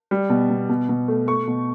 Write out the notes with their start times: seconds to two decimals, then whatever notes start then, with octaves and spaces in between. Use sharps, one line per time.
0.11 G3
0.30 B2
0.50 B2
0.69 B2
0.89 B2
1.08 A3
1.27 A3 C#6
1.47 B2